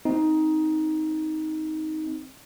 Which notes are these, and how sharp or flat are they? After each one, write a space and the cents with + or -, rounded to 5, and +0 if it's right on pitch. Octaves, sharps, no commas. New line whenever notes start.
C4 +0 D#4 +10